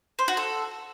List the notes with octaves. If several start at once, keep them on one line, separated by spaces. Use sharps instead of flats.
C5
F#4
A4